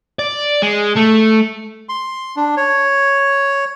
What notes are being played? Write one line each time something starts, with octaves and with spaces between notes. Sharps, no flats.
D5
G#3
A3
C6
D4
C#5